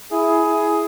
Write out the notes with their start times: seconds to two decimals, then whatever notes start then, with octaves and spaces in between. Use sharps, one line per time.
0.12 E4 G#4
0.44 E4